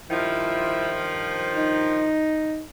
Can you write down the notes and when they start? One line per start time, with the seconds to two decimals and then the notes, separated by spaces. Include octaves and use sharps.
0.11 G2 D#3 F3 E4
1.55 D#4